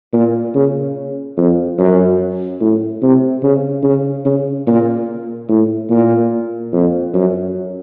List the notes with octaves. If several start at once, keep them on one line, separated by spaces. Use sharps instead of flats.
A#2
C#3
F2
F#2
A2
C3
C#3
C#3
C#3
A#2
A2
A#2
F2
F#2